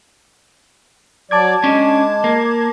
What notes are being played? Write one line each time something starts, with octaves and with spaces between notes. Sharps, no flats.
F#3 D5 A5 D6 G#6
G#3 C#4 D4
A#3